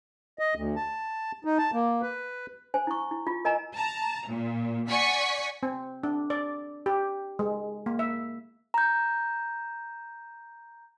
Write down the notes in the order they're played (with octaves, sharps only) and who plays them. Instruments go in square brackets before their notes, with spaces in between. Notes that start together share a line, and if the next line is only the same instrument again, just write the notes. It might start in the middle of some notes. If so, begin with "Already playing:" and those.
[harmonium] D#5
D2
A5
D#4
A5
A#3
B4
[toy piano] C5 G#5
E4 C#6
E4
F4
A#4 D#5 G#5 A#5
[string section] A5 A#5
A#2
D5 F#5 G#5 C#6 B6 C#7
[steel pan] C4
D4
D5
G4
G#3
A#3
E5
[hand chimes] A#5 G6